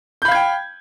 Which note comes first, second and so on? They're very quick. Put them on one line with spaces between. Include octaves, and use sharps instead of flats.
G6 B5 F5 G#6 G5